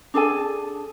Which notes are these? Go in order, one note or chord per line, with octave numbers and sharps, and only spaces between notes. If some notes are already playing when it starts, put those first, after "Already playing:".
D4 G#4 A4 G#5